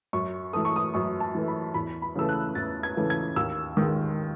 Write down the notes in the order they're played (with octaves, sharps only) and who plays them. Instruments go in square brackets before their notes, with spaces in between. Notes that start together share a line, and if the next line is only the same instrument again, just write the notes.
[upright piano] F#2 C#6
E3 A3 D#6
C#6
D#6
F#2 C#6
A5
E3 A3
B5
E2 B5
B5
C#3 E3 A3 E6
F#6
E2 A6
G#6
C#3 E3 A3
G#6
D#2 E6
D#3
G#3